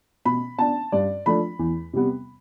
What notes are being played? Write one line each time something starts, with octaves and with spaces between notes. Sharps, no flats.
B2 B5
B3 D4 A5
G2 D5
F3 A3 D4 B5
E2
C3 G3 B3